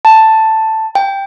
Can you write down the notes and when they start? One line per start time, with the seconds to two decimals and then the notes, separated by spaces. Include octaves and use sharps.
0.05 A5
0.95 G5